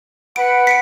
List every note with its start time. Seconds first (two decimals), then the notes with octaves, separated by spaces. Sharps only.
0.36 B4 F#5 B5 D7
0.67 B6 C#7 D7